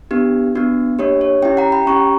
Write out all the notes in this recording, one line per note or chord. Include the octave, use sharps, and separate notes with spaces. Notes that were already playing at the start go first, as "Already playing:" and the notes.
B3 D4 G4
B3 D4 F#4
A#3 D4 G4 C#5
C#5
C#4 E4 G4 E5 G5
F#5 A#5
G5 B5
C#4 G4 A#5 C#6